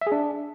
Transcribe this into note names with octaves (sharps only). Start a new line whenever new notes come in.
E5
G#4
D4